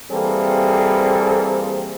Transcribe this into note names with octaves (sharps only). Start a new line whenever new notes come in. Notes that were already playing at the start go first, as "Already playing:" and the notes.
E3 G3 A#3 C4 G#4 A4